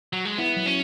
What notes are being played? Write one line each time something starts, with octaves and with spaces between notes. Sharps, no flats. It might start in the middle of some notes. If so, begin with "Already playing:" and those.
F#3
G#3
B3 E4
F#3
C#4